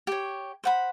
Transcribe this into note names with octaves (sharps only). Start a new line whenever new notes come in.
G4 C#5
C5 F#5 B5